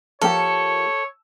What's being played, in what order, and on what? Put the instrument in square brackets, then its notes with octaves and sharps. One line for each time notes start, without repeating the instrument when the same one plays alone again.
[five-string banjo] F3 A#3 G4 [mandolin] A4 [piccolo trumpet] C#5